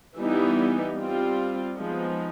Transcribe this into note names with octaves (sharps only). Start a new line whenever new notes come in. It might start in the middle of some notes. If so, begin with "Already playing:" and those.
E3 G3 B3 D#4
G3 C4 F4
F3 G#3 B3 D#4